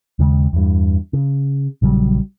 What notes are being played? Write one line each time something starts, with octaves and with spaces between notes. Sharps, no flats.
D#2 C#3 G#3
E2 G2
C#3
A#1 C#3 F#3 G3